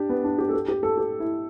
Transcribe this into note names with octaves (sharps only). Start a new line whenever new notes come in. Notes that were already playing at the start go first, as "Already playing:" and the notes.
Already playing: D4 G4
B3
D4
G4
A4
G4
G4
A4
G4
E4